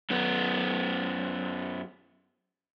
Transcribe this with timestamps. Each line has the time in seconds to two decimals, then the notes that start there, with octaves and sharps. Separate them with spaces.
0.11 F#2 B3